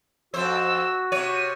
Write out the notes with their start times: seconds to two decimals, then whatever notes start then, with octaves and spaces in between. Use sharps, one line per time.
0.34 F2 F#4 C5 E6
1.12 C3 C#5 D#7